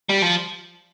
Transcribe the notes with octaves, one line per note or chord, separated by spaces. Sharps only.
G3
F3